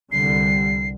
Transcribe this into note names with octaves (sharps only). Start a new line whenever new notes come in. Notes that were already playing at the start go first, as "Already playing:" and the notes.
C2 D3 G3 C7